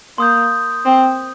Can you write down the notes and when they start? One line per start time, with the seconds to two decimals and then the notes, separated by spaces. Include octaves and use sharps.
0.18 A#3 C6 D#6 G6
0.85 C4